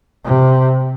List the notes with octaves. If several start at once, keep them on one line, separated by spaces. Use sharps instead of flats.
C3